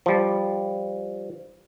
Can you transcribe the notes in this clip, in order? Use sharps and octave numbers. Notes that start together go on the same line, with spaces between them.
F3 G3